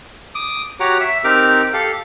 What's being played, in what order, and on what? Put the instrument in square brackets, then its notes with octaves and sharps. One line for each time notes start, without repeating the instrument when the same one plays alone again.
[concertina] D6 D#6
F#4 G4 C#5 F#5 A#5 D6
E5 E6
C4 D#4 G4 A#4 D6 F6
G4 A4 F5